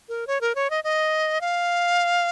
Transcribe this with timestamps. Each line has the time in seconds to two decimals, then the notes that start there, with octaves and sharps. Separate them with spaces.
0.09 A#4
0.27 C#5
0.41 A#4
0.55 C#5
0.70 D#5
0.84 D#5
1.41 F5